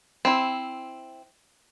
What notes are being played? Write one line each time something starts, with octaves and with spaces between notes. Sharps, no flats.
C4 E4